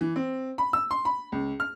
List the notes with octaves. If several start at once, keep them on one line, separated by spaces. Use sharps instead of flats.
E3
C4
B5
E6
C6
B5
C#2
F6